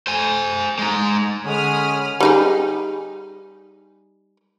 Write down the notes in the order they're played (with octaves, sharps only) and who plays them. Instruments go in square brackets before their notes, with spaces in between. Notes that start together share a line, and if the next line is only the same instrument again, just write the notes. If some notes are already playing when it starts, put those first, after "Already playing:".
[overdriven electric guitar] C5 G#5
G#3 D#4
[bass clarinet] D3 [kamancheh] G#3 [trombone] C#4 [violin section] B5 D#6 F6
[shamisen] G3 D#4 G#4